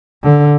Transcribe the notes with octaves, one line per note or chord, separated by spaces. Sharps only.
D3